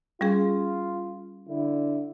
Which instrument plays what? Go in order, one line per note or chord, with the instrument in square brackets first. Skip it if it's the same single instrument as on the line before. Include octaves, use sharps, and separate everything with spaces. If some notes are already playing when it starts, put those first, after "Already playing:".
[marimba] G3 C#4 G#4 [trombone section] F4
[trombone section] D3 D4 E4